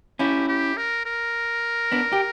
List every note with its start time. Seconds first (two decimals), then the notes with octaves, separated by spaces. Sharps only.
0.19 C#4 E4 G4
0.48 G4
0.77 A#4
1.06 A#4
1.92 B3 D4
2.13 G4